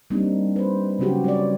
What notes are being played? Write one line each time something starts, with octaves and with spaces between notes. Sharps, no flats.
G3 A#3 C4 D4 D#4
B4 C5
C#3 F#3 C4 C#4 F#4 G4
G3 C#5 D5